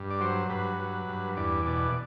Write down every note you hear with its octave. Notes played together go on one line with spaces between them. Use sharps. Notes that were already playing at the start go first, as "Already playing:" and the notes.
Already playing: G2
D5
F#3 C5
G2 B4
F#3
G2
E2 D5
B2 D5